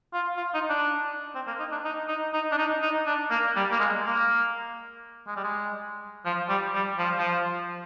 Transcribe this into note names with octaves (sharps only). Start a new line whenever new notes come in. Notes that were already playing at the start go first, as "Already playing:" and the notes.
F4
F4
D#4
D4
C4
A#3
D#4
D4
D#4
D#4
D#4
D4
D#4
D#4
D4
A#3
G3
A#3
G#3
A#3
G#3
G3
G#3
F3
G3
G3
F3
F3